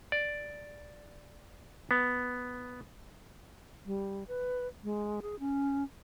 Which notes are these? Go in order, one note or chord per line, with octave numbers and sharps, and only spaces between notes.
D5
B3
G3
B4
G#3
G#4
C#4